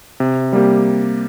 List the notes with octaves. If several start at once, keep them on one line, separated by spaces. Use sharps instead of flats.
C3
G3 A#3 G4